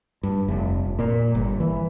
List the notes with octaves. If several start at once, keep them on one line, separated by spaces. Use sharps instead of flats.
G2
F1
A#2
G1
E3